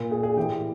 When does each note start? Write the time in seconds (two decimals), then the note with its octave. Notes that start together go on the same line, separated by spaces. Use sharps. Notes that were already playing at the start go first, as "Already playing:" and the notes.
Already playing: A#2
0.11 G#4
0.23 G#4
0.36 A2 E3 G4